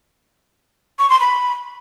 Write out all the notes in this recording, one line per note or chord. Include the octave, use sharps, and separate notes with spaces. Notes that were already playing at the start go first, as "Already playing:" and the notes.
C#6
C6
B5